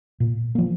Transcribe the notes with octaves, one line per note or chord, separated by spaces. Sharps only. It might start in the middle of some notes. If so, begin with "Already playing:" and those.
A#2
F3 A#3